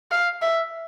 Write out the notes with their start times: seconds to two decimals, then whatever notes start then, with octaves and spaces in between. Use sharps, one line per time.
0.11 F5
0.42 E5